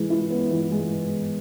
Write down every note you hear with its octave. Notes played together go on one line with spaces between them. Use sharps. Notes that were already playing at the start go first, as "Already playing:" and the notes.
Already playing: E3 G#3
E4
B3
E3
G#3